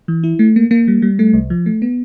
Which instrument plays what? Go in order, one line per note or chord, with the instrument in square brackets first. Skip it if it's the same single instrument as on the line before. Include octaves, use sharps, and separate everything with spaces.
[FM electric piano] E3
E4
A3
A#3
A#3
G3
G3
A3
C2
F3
A3
B3